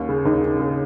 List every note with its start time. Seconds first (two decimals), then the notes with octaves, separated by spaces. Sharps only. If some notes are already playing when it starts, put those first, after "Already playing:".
Already playing: D#2 C#4
0.09 C#3
0.25 D#2 D#4
0.43 C#3
0.60 C#3